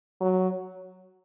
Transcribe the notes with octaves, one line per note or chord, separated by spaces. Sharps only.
F#3